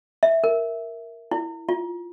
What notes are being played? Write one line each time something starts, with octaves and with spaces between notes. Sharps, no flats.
E5
A#4
E4
F4